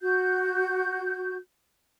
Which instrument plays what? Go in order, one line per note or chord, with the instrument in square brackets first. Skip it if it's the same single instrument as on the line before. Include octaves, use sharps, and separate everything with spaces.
[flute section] F#4 G6